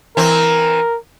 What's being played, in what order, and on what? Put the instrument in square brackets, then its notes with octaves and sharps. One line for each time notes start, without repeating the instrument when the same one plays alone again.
[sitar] E3 C4 [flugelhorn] A#4